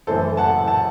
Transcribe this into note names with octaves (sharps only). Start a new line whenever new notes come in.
F#1 F#2 E3 A3 A4 C5
F#5 A5
F#5 A5